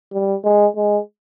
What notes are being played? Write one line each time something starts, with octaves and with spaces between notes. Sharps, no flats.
G3
G#3
G#3